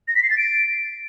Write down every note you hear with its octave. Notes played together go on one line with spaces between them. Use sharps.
A#6
B6
C7
A6
D7